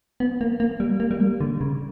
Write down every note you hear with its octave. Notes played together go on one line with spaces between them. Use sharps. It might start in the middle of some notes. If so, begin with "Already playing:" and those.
B3
A#3
A#3
G3
A#3
G3
A#3
D3
C#3